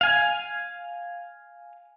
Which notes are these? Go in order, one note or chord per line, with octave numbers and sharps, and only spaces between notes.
F5 G#5